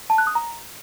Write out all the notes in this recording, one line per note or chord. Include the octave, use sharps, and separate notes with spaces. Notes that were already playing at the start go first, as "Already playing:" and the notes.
A5
F#6
D#6
A#5